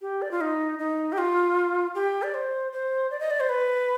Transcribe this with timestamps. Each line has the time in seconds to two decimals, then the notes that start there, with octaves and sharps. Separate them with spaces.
0.01 G4
0.22 D5
0.31 F4
0.41 D#4
0.79 D#4
1.12 G4
1.18 F4
1.95 G4
2.23 D5
2.34 C5
2.72 C5
3.11 D5
3.20 D#5
3.30 D5
3.40 C5
3.49 B4